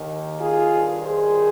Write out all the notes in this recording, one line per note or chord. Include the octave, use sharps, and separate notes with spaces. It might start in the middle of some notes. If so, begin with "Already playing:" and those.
Already playing: D#2 D#3
F4 G#4
G2 D#3
G#4 C5